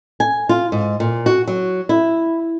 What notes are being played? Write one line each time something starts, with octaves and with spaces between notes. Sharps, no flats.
G#5
F4
G#2
A#2
F#4
F#3
E4